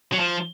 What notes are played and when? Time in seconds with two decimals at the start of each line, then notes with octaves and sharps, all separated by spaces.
0.12 F#3
0.19 F3